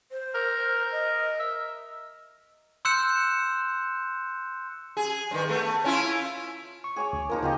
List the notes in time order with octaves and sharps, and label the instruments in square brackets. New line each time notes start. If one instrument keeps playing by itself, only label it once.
[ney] C5
[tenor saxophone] A#4
[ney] D#5
[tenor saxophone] E5
[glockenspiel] C6 E6 F#6 G6 C#7 E7
[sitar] G#4
G2 D#3
A3 B3
C#4 E4 F4
[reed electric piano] C#6
[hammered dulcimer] G#4 C#5 D6
[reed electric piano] D2
[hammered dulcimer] F3 A#3 D#4 [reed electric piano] A#4
[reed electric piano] C#3 [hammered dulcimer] F4 G4 D#5